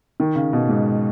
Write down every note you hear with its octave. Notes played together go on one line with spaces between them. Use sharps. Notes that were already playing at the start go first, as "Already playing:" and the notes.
D#3
C#3
B2
G#2